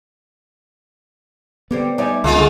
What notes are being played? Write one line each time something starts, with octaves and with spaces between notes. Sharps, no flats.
D3 G3 B3 C4
G3 D#4 E4 D5 G#5
C#2 G#3 A#3 F4
D3 G#4 C#6